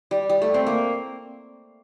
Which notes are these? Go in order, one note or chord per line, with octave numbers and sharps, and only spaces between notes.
G3
G3
A3
C4
A#3